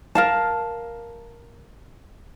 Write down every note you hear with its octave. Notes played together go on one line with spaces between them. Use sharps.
A#4 F5 A5